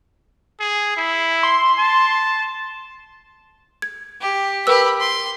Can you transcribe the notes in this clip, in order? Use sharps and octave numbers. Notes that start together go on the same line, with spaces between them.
G#4
E4
C6
A5
G#6
G4
G4 A#4 B4 B5 E6
C6